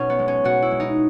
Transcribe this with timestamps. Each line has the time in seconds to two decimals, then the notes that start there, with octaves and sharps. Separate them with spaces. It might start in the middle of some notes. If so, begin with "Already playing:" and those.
Already playing: B2 C#4 D#4
0.10 B3
0.19 G#3
0.28 C#4
0.44 B2 F#4
0.62 E4
0.71 G#3
0.80 D#4